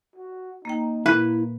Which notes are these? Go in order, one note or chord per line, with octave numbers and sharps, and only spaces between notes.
F#4
A#3 D#4 G5
A#2 A#3 E4 B4